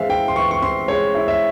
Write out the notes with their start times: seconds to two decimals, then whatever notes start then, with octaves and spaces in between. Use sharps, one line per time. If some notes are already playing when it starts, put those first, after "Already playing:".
Already playing: E3 G#3 C4 E5 F5
0.09 E4 G5
0.28 C6
0.36 E3 C#6
0.51 C#6
0.62 C4 C6
0.88 G#3 C#5
1.15 E4
1.28 E5